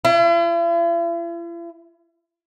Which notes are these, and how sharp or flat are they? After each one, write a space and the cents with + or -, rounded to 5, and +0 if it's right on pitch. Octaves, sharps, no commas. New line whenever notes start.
E4 +45